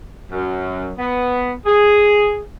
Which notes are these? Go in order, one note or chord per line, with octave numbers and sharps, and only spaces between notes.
F#2
B3
G#4